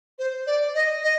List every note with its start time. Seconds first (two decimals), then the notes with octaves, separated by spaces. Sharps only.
0.18 C5
0.46 D5
0.74 D#5
1.02 D#5